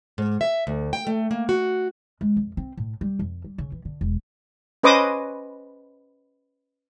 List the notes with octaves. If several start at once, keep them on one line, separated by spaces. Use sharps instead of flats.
G#2
E5
D2
G5
A3
A#3
F#4
G#3
F2
C4
A2
G3
F2
G3
C#3
E3
D3
E1
C#4 B4 C5 D#5 D6 D#6